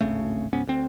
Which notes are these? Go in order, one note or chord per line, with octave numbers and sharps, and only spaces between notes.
D1 G#1 C#3 A3
C#2 G#2 B3 C#4
D2 C4